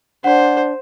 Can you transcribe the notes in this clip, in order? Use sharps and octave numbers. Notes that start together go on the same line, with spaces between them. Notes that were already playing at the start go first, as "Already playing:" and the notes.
D4 C5 F#5